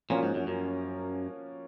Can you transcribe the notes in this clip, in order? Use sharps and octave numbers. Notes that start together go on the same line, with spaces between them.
A#2 F3 A#3 C#4 F#4 A#4
G#2
F#2
F#2